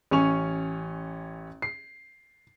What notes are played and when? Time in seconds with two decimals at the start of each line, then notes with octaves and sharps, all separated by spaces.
0.11 A1 C#4 G#5 C#6 F7
1.62 C7